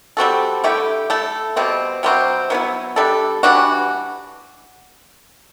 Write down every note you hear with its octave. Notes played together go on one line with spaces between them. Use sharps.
G3 C4 F#4 A4
D3 A3 E4 G4
A3 E4 A4
B2 G3 C4
C3 G3 C4 F#4
F#3 B3 E4
G3 D4 A4
E3 G3 D4 F#4